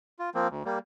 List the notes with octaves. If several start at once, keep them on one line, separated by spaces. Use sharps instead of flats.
F4
F3 A#3 C4
D2
G3 A#3